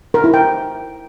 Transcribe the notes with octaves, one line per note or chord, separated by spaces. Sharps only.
A#4
E4
G5